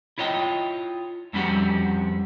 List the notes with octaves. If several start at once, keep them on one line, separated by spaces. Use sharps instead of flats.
E4 F4 C#5 D#5 G5
F2 G3 C#4 F#4 G4